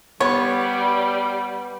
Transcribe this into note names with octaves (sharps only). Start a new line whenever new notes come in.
G3 B3 C#5